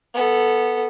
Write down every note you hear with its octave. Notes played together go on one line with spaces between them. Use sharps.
B3 A4